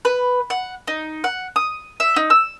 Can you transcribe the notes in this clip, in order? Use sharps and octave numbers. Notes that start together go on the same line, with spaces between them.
B4
F#5
D#4
F#5
D#6
E5
D#4
E6